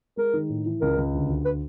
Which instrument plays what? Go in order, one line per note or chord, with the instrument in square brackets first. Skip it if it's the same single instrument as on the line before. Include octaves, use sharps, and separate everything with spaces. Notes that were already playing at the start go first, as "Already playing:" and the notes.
[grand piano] G#3 [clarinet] A#4
[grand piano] D#3
A2
E3
[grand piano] C#2 [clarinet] A#4
[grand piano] C#2
D2
D2
[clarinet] B4